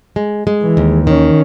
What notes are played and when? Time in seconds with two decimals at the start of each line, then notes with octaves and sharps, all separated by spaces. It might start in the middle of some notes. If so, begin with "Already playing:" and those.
0.16 G#3
0.47 G#3
0.62 E3
0.77 D#2
1.07 D#3 C#4